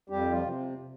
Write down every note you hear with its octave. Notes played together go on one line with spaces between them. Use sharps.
F2 G3 G4
F3 F4
C3 F3